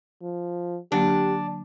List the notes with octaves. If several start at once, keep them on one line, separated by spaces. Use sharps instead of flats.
F3
D3 F#3 A#3 D4 G4